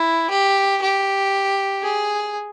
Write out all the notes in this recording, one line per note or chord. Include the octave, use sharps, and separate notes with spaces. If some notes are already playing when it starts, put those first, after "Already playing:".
Already playing: E4
G4
G4
G#4